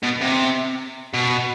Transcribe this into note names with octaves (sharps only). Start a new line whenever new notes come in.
B2
C3
B2